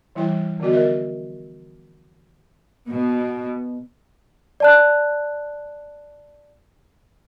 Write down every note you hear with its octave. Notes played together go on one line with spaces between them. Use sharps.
E3 G3 E4 G5
D3 F3 B3 F#4 D#5
A#4 D#5 E5
B2
D5 A5 F#6